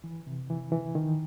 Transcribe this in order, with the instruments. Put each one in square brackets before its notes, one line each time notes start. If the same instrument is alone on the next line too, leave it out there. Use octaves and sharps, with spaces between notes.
[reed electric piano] E3
C3
E3
E3
D#3